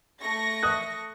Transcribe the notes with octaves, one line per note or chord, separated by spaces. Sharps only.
A3 C#6 A#6
D#6 F#6